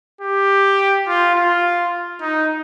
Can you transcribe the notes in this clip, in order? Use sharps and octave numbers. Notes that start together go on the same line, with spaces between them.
G4
F4
F4
D#4